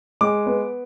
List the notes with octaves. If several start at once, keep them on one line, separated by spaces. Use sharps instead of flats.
G#3 D6
B3